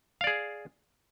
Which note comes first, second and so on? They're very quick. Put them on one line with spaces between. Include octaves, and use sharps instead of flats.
F5 D5 G#4